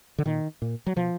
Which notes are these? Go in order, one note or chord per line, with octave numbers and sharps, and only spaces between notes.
D3
A#2 D#3
A#2
F#3
B2 F3